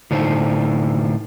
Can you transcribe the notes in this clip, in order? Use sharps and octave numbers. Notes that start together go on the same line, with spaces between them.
A2 D3 D4 D#4 C5